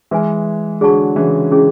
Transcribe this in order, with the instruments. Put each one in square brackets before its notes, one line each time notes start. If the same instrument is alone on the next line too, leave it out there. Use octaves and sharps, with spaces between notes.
[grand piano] E3 G#3 [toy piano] B4 E5 G#5
[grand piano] D3 F#3 [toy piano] G#4 D5 A5 C#6
[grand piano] C#3 E3
[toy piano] C#4 E4 G#4